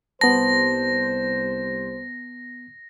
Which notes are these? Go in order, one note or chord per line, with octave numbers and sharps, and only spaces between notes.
C2 G3 B3 C5 A5 A#6